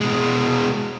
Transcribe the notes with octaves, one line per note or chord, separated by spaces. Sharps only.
B2 G#3